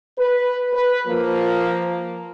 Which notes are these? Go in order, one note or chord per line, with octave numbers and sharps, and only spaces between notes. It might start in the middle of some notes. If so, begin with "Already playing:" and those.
B4
B4
F3 A#3